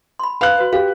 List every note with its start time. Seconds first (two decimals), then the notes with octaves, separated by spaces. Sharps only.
0.19 B5 C6
0.41 B4 F5 B5 F#6
0.58 F#4 B4
0.73 G4 F5